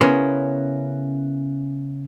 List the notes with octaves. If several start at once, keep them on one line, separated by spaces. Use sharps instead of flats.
C#3 B3 C#4 E4 A#4 C5